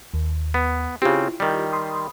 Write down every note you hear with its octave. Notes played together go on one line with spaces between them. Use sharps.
D#2
B3
C#3 C4 E4 F4 G4
D#3 G3
B5 C6 D#6